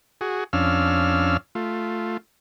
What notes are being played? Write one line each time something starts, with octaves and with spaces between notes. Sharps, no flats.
F#4 G#4
F2 C#4 D4 F5 E6 F6
A3 F4